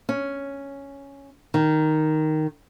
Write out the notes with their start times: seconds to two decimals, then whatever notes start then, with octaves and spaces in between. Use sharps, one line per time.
0.09 C#4
1.54 D#3